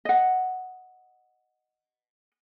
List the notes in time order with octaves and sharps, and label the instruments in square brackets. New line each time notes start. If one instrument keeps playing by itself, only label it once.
[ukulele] D#5 F#5